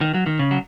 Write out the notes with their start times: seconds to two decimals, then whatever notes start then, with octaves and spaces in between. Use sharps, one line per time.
0.01 D#3
0.14 F#3
0.26 D#3
0.39 C#3
0.51 F#3